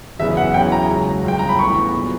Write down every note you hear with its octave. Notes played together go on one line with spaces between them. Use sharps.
F#1 E2 C#3 F#3 B3 E5
F#5
E2 C#3 F#3 C#4 E4 G5
A#5
C#2 C#3 F#3
G1 F#2 C#3 G5
A#5
B5
D2 C#3 E3 B3 C#6
A#2 F#3